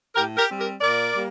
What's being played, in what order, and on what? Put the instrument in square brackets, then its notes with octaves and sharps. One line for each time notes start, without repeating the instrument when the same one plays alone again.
[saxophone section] A2 G4 A#4
G4 A#4
G3 C4
G4 A#4
A#2 A#4 D5
G3 A#3